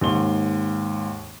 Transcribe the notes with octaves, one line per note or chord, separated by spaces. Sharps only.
D#2 G#2 C6 G7